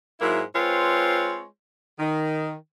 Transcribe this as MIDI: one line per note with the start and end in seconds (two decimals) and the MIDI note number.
0.21 0.42 44
0.21 0.42 54
0.21 0.42 58
0.21 0.42 64
0.55 1.45 56
0.55 1.45 60
0.55 1.45 65
0.55 1.45 71
0.55 1.45 73
1.99 2.53 51